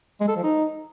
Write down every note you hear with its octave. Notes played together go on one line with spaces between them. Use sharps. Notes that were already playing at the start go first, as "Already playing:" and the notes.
G#3
A4
F3
D#4